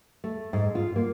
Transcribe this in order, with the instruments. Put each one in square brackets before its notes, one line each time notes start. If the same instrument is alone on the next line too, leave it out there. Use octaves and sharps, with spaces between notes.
[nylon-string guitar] A3
G#2
F4
A#3